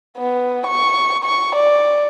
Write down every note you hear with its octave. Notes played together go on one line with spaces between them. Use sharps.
B3
C#6
C#6
D5